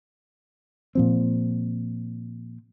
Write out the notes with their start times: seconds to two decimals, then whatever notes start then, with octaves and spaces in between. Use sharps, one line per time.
0.95 A#2 F3 C4